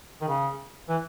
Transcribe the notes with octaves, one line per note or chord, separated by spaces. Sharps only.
D#3
C#3
E3